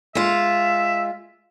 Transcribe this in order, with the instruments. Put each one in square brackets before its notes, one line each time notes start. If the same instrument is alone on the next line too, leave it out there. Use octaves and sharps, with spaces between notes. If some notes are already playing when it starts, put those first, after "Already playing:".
[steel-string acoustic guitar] G#3 F4 [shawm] E5